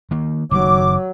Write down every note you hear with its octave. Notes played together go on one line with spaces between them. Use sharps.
D#3 A#3
F#1 D#3 F#3 D6